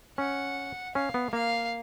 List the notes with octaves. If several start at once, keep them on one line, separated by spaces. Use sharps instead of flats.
C#4 F#5
C#4 F5
B3
A#3 F5